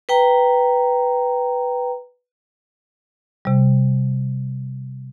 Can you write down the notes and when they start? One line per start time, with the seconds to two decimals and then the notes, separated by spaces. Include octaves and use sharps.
0.09 B4 G5 A#5
3.45 C3 G3